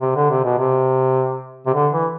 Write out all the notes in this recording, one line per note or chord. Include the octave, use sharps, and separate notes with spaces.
C3
D3
C3
B2
C3
C3
D3
E3